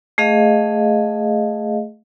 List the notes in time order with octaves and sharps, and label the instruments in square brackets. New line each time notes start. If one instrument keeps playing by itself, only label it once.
[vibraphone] A3 G#4 D#5 F5